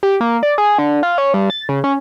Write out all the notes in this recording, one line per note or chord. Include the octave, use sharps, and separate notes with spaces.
G4
A#3
D5
G#4
D3
F4
C#4
G2
A6
C#3
C#4